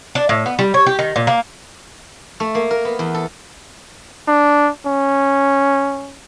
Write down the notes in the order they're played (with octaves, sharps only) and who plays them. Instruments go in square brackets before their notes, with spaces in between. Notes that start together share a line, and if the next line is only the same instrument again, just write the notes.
[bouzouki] D4
A2
B3
G3
C#5
G4
D#3
A#2
A#3
[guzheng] A3
A#3
A#4
B3
E2
A4
[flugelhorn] D4
C#4